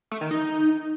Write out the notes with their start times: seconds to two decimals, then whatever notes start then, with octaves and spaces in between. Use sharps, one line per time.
0.11 A3
0.21 D#3
0.31 D#4